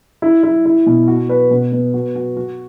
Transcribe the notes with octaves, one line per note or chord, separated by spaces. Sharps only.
E4
E4
E4
B2
F#4
B4
B2
B3
F#4
F#4
F#4